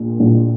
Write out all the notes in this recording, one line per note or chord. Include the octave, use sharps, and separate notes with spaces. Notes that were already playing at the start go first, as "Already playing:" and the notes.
Already playing: A#1 A#2
A#1 A#2